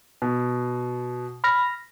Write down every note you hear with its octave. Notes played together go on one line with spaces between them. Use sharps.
B2
B5 F6 A#6